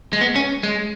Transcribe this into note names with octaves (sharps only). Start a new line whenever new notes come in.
G#3
B3
C#4
G#3